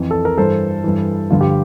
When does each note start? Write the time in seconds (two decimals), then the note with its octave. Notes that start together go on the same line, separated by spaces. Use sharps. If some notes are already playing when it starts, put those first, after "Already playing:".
Already playing: F2 E3
0.11 A4
0.25 A#4
0.38 G2 E3 A4 C5
0.84 G2 E3
1.30 G2 D3 F3 F4
1.41 G4